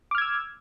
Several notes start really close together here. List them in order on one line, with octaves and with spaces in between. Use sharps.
D6 F6 G#6 E6